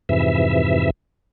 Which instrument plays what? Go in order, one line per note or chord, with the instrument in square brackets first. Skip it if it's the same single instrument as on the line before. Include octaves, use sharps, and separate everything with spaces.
[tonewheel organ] F2 G#2 C3 E3 E5